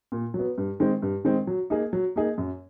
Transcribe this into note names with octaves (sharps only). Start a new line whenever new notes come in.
A#2
F#3
B3
G2
D#3 G#3 C4
G2
D#3 G#3 C4
F#3
A#3 D#4 G#4
F#3
A#3 D#4 G#4
F#2